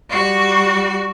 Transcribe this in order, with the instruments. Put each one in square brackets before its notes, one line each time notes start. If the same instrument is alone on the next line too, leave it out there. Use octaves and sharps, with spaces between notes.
[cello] G3 F#4